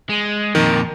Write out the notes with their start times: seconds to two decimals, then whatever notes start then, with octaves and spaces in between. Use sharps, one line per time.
0.10 G#3
0.55 F2 A#2 D#3